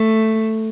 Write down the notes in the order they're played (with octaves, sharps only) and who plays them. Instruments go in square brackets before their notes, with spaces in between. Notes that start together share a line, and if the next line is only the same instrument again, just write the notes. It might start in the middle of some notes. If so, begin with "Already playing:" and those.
Already playing: [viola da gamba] A3